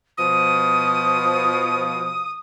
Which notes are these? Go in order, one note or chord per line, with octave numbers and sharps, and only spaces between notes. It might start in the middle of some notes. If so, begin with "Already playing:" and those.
B2 F3 D#6